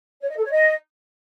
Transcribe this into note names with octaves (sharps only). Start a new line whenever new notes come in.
C#5
D#5
A4
C#5
D#5